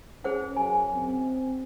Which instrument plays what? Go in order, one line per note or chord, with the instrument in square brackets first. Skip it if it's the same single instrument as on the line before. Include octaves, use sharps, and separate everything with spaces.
[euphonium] C#4 [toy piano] G#4 C5 F#5
[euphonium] F#2 [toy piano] G#5
[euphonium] C4